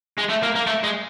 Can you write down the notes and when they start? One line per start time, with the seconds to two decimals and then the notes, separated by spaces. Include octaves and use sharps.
0.18 G#3
0.29 A3
0.43 A#3
0.55 A#3
0.67 A3
0.84 G#3